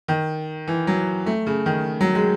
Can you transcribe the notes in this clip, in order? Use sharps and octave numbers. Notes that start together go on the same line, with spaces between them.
D#3
E3
F#3
A3
C#3
D#3
F#3
G#3